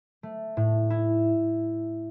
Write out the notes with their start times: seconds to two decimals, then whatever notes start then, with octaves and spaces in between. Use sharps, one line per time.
0.23 A3
0.57 A2
0.90 E4